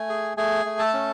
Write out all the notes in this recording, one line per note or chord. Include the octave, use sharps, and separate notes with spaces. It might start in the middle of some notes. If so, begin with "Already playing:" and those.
Already playing: A3 G#5
G#4
A3 G#4 G#5
A3
A4 A5
C#4